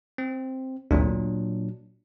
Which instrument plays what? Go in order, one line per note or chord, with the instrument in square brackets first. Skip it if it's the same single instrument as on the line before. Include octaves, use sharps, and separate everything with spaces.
[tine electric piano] C4
[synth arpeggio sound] G#1 D2 [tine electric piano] A#2 F#3 D4